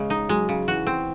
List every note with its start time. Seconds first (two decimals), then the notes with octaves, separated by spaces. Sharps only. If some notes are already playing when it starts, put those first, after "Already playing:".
Already playing: C#3 G#3
0.10 D#4
0.29 F#3 G#3
0.49 C#3
0.68 E3 F#4
0.87 C4